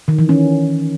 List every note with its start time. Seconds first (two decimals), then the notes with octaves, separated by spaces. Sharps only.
0.08 D#3
0.19 E3
0.29 C#4